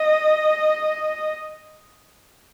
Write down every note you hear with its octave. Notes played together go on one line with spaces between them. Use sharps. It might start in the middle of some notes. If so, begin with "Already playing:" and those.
Already playing: D#5